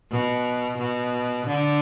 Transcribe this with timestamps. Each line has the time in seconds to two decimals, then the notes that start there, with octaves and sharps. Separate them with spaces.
0.11 B2
0.78 B2
1.47 D3